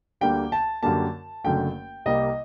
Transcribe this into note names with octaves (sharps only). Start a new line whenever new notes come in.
D2 D3 G3 A#3 G5
A5
F#2 D3 G3 A#3 A5
F#1 F#2 D3 A3 G5
C2 C3 G3 A#3 D#5